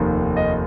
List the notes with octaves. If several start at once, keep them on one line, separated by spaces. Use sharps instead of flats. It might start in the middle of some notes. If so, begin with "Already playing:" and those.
Already playing: F1 D#2 D#3
D#5